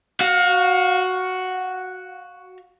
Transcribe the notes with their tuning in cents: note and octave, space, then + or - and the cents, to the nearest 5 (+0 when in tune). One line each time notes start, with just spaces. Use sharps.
F#4 +0 F5 +30